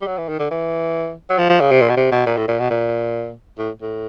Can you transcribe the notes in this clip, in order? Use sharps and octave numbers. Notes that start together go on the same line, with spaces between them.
G3
F#3
E3
D#3
D3
E3
F#3
F3
F3
C#3
C3
A#2
B2
C3
B2
A#2
A2
A#2
B2
A#2
A2
A2